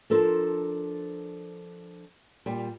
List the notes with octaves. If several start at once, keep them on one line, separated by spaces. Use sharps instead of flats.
F3 D4 A4 A#4 C5
A#2 G3